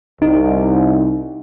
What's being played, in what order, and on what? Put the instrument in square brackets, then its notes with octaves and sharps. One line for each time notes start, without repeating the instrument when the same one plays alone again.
[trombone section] C2 [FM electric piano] D#4